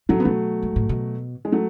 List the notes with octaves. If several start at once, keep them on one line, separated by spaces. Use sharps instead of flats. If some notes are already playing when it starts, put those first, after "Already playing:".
A2 F#3 A3
B3
B2 F#3 A3
G#2
A2
B2
G#3
F#3 A3